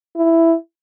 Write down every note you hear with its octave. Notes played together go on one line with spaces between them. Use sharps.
E4